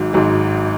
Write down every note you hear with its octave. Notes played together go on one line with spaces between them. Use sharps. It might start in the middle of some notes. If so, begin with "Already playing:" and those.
Already playing: G#1 G#2 F#3
G#1 G#2 F#3